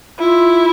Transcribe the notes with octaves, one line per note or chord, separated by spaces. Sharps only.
E4 F4